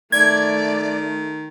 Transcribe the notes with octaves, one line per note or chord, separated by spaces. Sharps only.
D#3 A3 D5 G#6